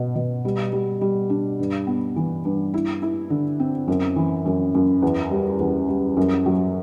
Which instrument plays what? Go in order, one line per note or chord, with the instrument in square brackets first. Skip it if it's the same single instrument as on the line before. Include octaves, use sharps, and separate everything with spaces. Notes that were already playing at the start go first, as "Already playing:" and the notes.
Already playing: [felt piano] B2
B2
G3
G3
G3
D4
G2
B3
E3
G2
E4
E4
D3
C4
F#2
E3
F#2
F#2
E2
G3
E2
G3
F#2
F#3